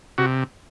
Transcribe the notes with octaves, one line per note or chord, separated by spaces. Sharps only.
C3 F#4